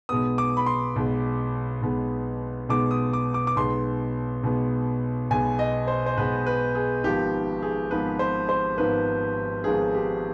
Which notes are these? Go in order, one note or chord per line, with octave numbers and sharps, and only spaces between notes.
B1 B2 G#3 B3 D#6
D6
B5
C6
B1 B2 G#3 B3
B1 B2 G#3 B3
B1 B2 G#3 B3 D6
D#6
D6
D6
D6
B1 B2 G#3 B3 C6
B1 B2 G#3 B3
B1 B2 G#3 B3 G#5
D#5
C5
C5
B1 B2 G#3 B3 B4
B4
G#4
G#1 G#2 F3 B3 G4
G#4
G#1 G#2 F3 B3 B4
C5
C5
G#1 G#2 F3 B3 B4
G#1 G#2 F3 B3 G#4
G4